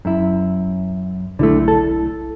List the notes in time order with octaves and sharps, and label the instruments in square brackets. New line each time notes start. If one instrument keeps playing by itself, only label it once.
[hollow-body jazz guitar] F#2 E4
[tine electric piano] B1 E4 [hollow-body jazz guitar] D3 A3
[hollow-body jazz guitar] A4